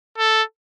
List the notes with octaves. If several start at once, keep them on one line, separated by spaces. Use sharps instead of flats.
A4